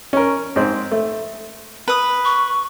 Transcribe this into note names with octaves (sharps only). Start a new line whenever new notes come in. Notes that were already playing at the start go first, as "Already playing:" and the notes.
C#4 A#4
G#2 C4
A3
B4 D#6
C#6